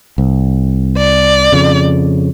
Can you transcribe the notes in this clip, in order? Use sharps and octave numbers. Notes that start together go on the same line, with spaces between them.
C2
D5
F2 C#3